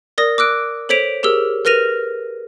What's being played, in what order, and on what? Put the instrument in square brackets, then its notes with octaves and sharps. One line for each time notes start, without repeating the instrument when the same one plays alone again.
[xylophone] A#4 D5 D#6 A#6
D6 E6 F#6 D7
A4 C5 C#5 B6 D7 F7
G4 G#4 A#4 E6
A#4 B4 F6 A#6 D#7 F7